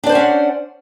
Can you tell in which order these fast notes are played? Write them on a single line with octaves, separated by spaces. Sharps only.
D4 D5 C5 F#5 C#4